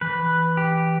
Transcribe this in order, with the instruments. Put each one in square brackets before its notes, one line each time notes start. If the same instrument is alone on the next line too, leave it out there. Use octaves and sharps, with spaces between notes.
[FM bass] E3 [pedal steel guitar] B4
[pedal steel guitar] G4